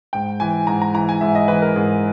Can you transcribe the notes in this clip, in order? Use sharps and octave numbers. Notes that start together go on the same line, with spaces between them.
G#2 G5
E3 G#5
G#2 A#5
A#5
E3 A#5
G#5
G#2 E5
D#5
E3 B4
A#4
G#2 G#4